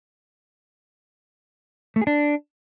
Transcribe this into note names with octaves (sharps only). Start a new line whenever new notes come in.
A3
G#4
D4